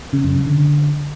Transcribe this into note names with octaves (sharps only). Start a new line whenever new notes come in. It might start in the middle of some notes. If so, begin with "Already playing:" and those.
C#3
F#2
C#3
D3